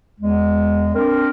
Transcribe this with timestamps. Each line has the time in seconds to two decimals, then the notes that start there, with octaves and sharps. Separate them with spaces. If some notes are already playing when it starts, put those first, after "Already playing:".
0.19 E2 G#3
0.94 C4 D4 A#4